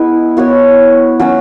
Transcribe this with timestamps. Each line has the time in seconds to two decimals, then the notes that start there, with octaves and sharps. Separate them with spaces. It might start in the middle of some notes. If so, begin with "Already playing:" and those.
Already playing: G#3 B3 E4 B4
0.37 B3 F#4 C#5
1.20 F#3 C#4 F#4